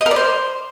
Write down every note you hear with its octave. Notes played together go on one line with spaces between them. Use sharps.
D#5
A#4
D5
C5